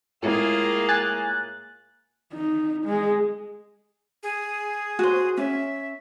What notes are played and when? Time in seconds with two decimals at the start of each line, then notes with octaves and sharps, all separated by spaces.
0.23 A2 G#3 A#3 E4 F4 G#4
0.89 G#5 F#6 A6
2.33 D#4
2.85 G#3
4.23 G#4
4.99 F#4 C5
5.37 C#4 E5